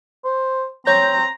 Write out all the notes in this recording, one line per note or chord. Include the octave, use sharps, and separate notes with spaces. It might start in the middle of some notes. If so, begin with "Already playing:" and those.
C5
C4 C#5 A#5 G6